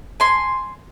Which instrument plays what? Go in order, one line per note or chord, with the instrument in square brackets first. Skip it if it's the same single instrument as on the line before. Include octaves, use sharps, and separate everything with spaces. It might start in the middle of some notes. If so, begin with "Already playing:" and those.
[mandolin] G#5 C6